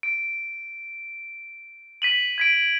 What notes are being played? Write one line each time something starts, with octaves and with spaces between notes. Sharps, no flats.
D7
B6 D#7 F#7
G#6 B6 D7